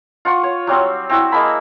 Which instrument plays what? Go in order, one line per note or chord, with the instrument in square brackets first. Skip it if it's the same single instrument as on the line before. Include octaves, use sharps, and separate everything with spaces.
[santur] F4 F#5 C#6
C#5
F#3 G3 C4
C4 E4 F#4 E5
G#3 A#3 A5 B5